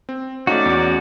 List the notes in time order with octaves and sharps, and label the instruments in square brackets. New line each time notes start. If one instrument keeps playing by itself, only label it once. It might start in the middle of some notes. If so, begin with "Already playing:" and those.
[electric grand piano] C4
[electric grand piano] A3 C#4 D#4 [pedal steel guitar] F#4 D5
[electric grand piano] E2 C#4